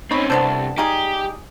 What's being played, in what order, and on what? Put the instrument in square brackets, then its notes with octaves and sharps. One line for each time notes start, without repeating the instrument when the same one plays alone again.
[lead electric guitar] C4 C#4 [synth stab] D#4 C#5 B5
[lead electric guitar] C2 [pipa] B3 D4 A4 [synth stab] C5
[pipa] G3 D#4 G#4 [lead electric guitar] G4